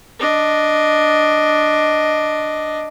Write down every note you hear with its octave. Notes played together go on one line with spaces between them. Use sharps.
D4 D#5